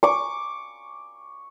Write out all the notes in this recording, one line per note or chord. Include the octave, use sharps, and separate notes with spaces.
C#6 D6